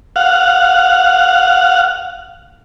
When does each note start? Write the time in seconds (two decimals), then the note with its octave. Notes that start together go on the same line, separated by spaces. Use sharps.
0.16 F5 F#5